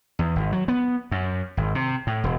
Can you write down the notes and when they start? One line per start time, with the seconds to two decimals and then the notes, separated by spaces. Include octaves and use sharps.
0.19 E2
0.36 G#1
0.52 F#3
0.68 B3
1.11 F#2
1.57 G#1
1.75 C3
2.07 A2
2.24 E1